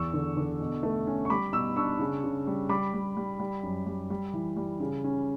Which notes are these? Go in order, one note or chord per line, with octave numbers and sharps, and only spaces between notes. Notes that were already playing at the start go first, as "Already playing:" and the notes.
Already playing: E2 C#6 E6
D3
D3
B2
A3
C#4
C#6
G3 B5 D6
B2 C#6 E6
D4 C#6 E6
C#3
C#3
G3
G3 B5 D6
G3
G3
G3
F#2
G3
G3
E3
G3
C#3
C#4